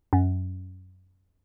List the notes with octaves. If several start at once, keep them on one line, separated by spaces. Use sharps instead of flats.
F#2